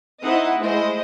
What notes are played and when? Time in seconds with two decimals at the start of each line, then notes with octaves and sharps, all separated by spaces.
0.23 C4 D#4 E4 D#5 F#5
0.59 G#3 A3 E4 C5 D#5